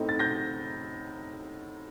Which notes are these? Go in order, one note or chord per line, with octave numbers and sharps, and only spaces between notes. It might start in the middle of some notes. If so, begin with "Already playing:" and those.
Already playing: A2 A3 C4 D#4
A6
G6 A#6